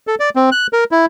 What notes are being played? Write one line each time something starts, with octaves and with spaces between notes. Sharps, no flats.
A4
D5
C4
F#6
A#4
E4